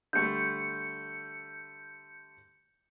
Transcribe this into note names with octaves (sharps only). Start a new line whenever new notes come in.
D3 G3 A3 G6 C#7